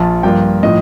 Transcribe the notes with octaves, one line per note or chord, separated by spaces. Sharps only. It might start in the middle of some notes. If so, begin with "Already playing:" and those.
Already playing: A#1 F4 A5
G2 F3 A#3 F4 G5
A2 F3 D#5